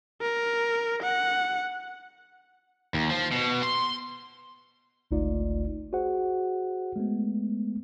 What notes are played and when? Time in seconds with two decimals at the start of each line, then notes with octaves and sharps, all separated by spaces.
0.21 A#4
1.03 F#5
2.94 D#2
3.10 F3
3.32 B2
3.63 C6
5.11 G1 C#2 A3 D#4 F4 D5
5.93 F#4 G#4 C5 F#5
6.96 G#3 A3 B3